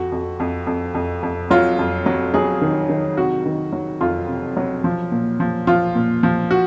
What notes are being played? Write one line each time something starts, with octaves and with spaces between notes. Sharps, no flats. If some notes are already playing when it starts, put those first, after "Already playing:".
Already playing: F2 F#4
F2
F2
F2
F2
F2
F#3 F4
F2
F#3
F#3 G#4
D#3
D#3
C3 F#4
D#3
F#3
F2 F4
C3
F#3
F3
A#2
F3
F3 F4
A#2
F3
F#4